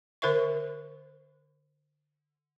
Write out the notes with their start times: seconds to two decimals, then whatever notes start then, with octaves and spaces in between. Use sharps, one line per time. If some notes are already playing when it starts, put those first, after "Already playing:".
0.22 D3 A#4 C5 E5 C#6